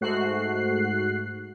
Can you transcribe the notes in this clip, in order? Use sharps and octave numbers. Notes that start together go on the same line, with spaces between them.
G#2 A3 F#4 F#6 C7